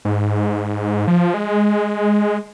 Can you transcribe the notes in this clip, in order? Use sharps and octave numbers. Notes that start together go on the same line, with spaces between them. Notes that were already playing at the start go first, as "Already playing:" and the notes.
G#2
F3
G#3